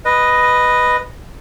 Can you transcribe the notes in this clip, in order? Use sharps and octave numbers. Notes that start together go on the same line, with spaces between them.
B4 D#5